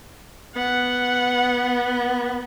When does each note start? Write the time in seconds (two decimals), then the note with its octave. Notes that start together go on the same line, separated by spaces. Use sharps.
0.56 B3 F#5